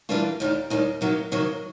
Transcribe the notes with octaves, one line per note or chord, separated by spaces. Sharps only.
E3 G3 A#3 D4 F4
D#2 D#3 G3
D#2 D#3 G3
C3 D#3 F#3 A#3
C3 D#3 F#3 A#3